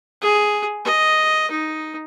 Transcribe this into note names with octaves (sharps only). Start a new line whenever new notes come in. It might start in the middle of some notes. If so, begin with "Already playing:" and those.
G#4
D#5
D#4